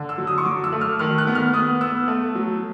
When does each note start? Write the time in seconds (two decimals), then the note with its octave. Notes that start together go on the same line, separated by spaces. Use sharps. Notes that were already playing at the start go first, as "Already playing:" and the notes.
Already playing: D3
0.09 E6
0.18 F#3
0.27 D#6
0.38 C#6
0.45 F#3 D6
0.64 E6
0.72 A3
0.81 F6
0.99 D#3 F6
1.18 F#6
1.27 B3
1.35 F6
1.53 B3 D#6
1.81 B3 E6
2.08 A3
2.35 F#3